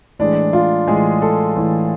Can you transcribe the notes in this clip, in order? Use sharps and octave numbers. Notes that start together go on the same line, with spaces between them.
A2 E3 G#3 D4
F4
A2 E3 G#3 G#4
A4
A2 E3 G#3